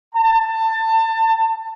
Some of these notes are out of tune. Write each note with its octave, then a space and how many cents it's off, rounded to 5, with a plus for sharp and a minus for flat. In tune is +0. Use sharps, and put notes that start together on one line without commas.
A5 +25